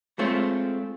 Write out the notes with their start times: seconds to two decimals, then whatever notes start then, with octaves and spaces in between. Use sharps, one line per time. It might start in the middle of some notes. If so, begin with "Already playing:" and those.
0.19 G#3 A3 C4 F4 A4 C#5